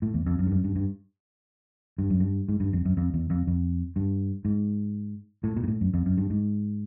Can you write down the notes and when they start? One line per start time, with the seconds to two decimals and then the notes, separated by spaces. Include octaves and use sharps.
0.02 A2
0.14 E2
0.26 F2
0.39 F#2
0.47 G2
0.52 F#2
0.64 G2
0.76 G2
1.98 G2
2.10 F#2
2.20 G2
2.48 G#2
2.60 G2
2.73 F2
2.85 F#2
2.97 F2
3.14 E2
3.30 F2
3.47 F2
3.96 G2
4.45 G#2
5.44 A2
5.57 A#2
5.64 G#2
5.68 A2
5.81 F#2
5.94 F2
6.06 F#2
6.17 G2
6.30 G#2